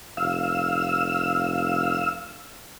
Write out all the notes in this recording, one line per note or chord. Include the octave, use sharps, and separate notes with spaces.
F1 F5 E6